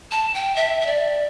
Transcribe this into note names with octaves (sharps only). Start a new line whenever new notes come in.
A5
G5
E5
E5
D5